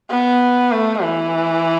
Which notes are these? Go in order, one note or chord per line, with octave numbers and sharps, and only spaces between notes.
B3
A3
E3